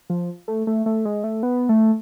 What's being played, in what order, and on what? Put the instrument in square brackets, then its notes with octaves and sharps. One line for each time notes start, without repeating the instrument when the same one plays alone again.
[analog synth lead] F3
A3
A3
A3
G#3
A3
B3
A3